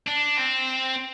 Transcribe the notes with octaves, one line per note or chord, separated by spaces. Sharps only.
D4
C4